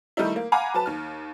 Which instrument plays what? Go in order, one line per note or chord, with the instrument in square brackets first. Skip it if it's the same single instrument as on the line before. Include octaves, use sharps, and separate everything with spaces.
[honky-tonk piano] D#3 G3 A3 D#4 E4
A#3
F5 F#5 G#5 A#5 B5 D6
F#3 B4 A5
D#2 F6